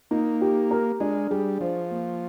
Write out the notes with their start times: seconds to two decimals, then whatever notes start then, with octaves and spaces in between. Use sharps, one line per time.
0.11 A#3 D#4
0.41 G4
0.71 A#4
1.00 G#3 D4
1.30 G3 G#4
1.61 F3 C5
1.91 A#3